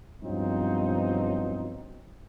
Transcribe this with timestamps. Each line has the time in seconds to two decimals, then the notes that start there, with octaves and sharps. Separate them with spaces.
0.23 G2 B2 F3 F#3 C4 D#4